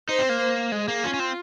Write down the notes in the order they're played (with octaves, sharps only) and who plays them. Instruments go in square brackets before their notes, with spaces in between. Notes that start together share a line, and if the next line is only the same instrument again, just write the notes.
[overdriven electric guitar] D#4 [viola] C5
[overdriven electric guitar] C4
A#3
[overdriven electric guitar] G#3 [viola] G#4
[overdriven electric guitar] A#3
[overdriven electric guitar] C#4 [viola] F4
[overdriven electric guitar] C#4
C4